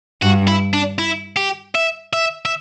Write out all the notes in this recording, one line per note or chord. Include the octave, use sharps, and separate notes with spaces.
G2 F#4
E4
D4
E4
G4
E5
E5
E5